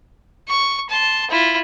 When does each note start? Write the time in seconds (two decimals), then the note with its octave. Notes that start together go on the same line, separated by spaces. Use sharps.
0.48 C#6
0.89 A5 C6
1.30 E4 F4